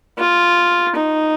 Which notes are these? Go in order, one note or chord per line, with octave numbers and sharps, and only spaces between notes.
F4
D#4